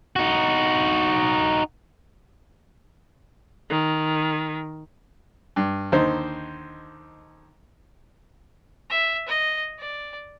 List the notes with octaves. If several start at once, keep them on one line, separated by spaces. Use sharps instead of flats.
D#4 F#4
D#3
G2
D#2 D3 D#4 C5
E5
D#5
D5